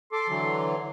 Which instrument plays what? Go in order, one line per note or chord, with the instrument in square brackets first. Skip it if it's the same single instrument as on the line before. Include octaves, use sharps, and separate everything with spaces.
[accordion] A4 D6 [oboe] C6
[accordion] D3 E3 F#3